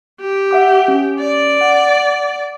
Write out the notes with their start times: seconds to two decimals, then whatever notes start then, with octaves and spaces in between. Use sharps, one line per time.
0.20 G4
0.51 E5 F#5 D6
0.88 C#4
1.19 D5
1.61 F#5